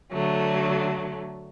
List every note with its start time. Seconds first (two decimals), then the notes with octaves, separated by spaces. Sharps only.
0.10 D3 F#3 A3